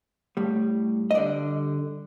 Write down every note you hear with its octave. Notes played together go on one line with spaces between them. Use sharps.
A2 G3
D#5
G2 D3 G3 D5